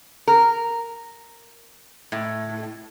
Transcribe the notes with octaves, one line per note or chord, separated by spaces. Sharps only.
A#4
A2